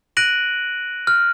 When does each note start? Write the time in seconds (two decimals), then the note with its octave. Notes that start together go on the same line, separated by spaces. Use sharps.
0.17 F#6 A#6 D7 D#7 F#7
1.07 F6